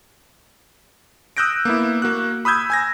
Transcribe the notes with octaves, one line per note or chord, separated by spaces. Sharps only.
D#6 E6 F#6 G6 A#6 D7
A#3 B3 E4
A#3 F#4 F#6
B5 D#6 E6 G6 G#6
G#5 G#6 A#6